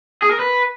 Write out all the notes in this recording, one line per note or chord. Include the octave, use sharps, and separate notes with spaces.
G#4
A#4
B4